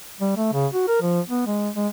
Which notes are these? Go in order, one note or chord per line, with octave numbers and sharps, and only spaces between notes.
G3
A3
C#3
F#4
A#4
F3
B3
G#3
G#3